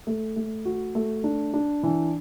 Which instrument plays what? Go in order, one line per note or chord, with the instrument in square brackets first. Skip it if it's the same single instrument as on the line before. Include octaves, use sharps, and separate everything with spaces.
[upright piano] A3
A3
F#4
A3
D4
D4
E3